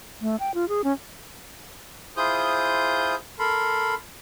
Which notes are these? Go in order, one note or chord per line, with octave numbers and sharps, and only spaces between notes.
A3
G5
F4
G#4
C#4
E4 F4 G#4 C5 D#6 G6
A4 A#4 B5 C6